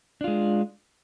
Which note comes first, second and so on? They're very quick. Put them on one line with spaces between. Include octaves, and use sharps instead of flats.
D4 F4 G#3